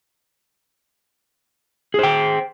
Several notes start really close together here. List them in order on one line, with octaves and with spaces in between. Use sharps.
G#4 C5 G5